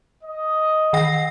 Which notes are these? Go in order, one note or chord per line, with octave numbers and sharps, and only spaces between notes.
D#5
D#3 G5 A#6